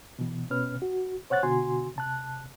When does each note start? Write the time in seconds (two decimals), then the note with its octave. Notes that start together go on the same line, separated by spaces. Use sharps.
0.19 B2 E3
0.51 B2 C#4 B4 F6
0.82 F#4
1.30 C5 C#5 F#5 F#6 A6
1.43 B2 D3 F#4 G#5 C6
1.96 C3 A5 F#6